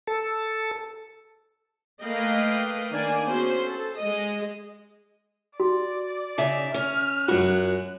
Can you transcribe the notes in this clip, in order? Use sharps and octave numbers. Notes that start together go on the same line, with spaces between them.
A4
A3 A#3 B4 D#5 F5 G5
D#3 A#3 D4 D5 G#5
B3 C#4 F#4 G#4 C5
A4
G#3 D#5
F#4 D5
C#3 D#4 E5
C#4 F6
F#2 F4 F#4 F#6